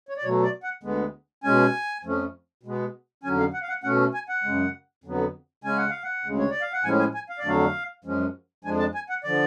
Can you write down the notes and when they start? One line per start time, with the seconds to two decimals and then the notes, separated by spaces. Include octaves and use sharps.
0.09 C#5
0.17 D5
0.23 B2 F#3 A3 C#5
0.43 D5
0.63 F#5
0.83 D2 D3 G#3 B3
1.44 B2 G#3 C#4 G#5
2.04 F2 F3 A3 C#4
2.63 B2 G#3 B3
3.23 F2 D3 F#3 C#4 G#5
3.39 F5
3.54 F#5
3.62 F5
3.69 F#5
3.83 B2 A3 C#4 F#5
4.14 G#5
4.29 F#5
4.44 F#2 C#3 G#3
5.04 F2 D3 F#3 B3
5.64 C#3 G#3 C#4 G#5
5.77 F#5
5.90 F5
6.04 F#5
6.24 D2 C#3 G#3
6.39 C#5
6.50 D5
6.62 F5
6.73 F#5
6.84 A2 F3 G#3 C#4 G#5
6.99 G#5
7.14 G#5
7.30 F5
7.39 D5
7.44 F2 D3 F#3 A3 D4 F5
8.04 F#2 F3 G#3 C#4
8.64 F2 F3 G#3 D4 G#5
8.79 A5
8.95 G#5
9.09 F#5
9.24 D3 F3 D5